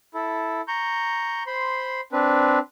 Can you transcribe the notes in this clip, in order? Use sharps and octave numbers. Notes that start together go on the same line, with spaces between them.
E4 A4
A#5 C#6 G6
C5 B5 C6
C4 D4 B4